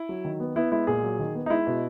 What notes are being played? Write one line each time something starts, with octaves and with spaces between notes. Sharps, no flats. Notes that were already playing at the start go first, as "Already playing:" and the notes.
Already playing: E4
F#3
D#3
B3
B3 E4
G#3 E4
A#2 G#4
F#3
D#3
B3
D#4
G#3 E4
B2